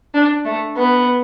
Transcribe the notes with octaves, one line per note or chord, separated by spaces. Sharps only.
D4
A3
B3